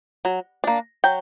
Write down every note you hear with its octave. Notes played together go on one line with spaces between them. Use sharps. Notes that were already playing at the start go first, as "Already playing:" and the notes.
F#3
A#3 D4
F#3 G5